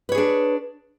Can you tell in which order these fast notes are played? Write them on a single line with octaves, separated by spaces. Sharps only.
B4 C#5 G#4 D4